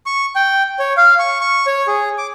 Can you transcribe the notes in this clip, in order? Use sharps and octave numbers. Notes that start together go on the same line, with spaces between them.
C#6
G5
C#5
F5
C#6
C#6
C#5
G#4
D6